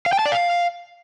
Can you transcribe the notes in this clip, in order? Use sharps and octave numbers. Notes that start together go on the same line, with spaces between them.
F5
G5
A5
D5
F5